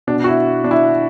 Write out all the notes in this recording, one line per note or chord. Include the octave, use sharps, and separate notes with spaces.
B2 D4
F#4
E4
D4
E4